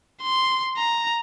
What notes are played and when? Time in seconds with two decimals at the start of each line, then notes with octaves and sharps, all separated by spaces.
0.23 C6
0.77 A#5